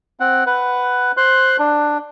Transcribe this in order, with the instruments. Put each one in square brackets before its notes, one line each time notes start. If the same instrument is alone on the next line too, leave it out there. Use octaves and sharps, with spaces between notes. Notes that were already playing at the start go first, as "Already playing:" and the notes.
[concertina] C4 F#5
B4 F#5
C5 C6 F#6
D4